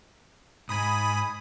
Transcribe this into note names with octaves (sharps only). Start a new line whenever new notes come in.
G#2 G#5 B5 D#6